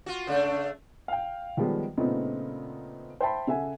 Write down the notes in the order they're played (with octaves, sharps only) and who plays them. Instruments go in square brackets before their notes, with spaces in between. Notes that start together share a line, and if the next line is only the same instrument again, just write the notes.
[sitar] F4 F#4
C#3 A3 D4
[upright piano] F5 G5
D#3 F3 G3 G#3 B3
A#2 C#3 A3 B3 C4 D#4
C5 E5 G5 A5 B5
C#3 A4 E5 F#5 G#5